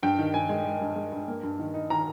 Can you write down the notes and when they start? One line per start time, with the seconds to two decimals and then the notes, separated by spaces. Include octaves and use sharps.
0.03 G2 G5
0.18 D#3
0.33 G2 G#5
0.49 G#3
0.65 G#3
0.81 G2
0.96 G#3
1.12 G2
1.28 A#3
1.43 G2
1.59 D#3
1.74 D#4
1.90 D#3 A#5